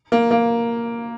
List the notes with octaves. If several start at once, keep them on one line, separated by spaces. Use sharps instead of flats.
A#3
A#3